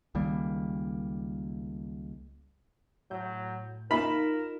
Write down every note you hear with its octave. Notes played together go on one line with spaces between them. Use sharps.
C#2 D#3 G3 A#3
A2 F#3 G6
D#4 F4 A#4 B5 E7